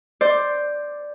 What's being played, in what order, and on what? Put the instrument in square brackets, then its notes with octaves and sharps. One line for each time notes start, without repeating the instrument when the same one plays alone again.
[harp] C5 D5